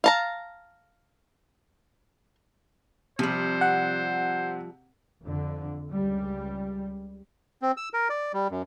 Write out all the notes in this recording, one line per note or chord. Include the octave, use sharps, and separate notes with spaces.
F5 A5 A#5
C3 F3 G3 C5
F#5
F2 D3
C#2 G3
C4
E6
A#4
D5
G3
F#2